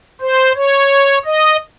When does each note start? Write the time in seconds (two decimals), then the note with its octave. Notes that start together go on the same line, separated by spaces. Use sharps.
0.21 C5
0.56 C#5
1.25 D#5